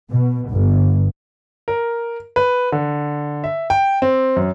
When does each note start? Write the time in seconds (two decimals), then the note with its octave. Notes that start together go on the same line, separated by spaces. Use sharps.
0.11 B2
0.51 G1
1.68 A#4
2.36 B4
2.72 D3
3.44 E5
3.70 G5
4.02 C4
4.36 F#2